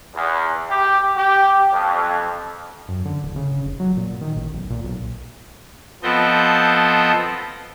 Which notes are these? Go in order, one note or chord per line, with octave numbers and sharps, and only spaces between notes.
E2
G4
G4
F2
F#2
D3
D1
C#3
F1
F#3
A#2
D#3
A1
B1
A#2
B1
F3 B3 C4 A4 D#5 G6